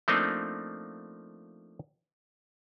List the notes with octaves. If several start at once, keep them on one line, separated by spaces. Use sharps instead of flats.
F3 A3 A#3 C4 D4 D#4